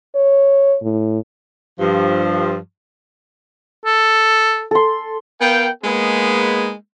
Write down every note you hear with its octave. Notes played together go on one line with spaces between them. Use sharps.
C#5
A2
G2 F3
A4
A4 C6
B3 A#4 F5 G5
G#3 A#3 B3 D#4 G#4 B4